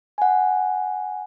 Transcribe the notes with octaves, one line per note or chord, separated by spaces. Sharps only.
F#5 G#5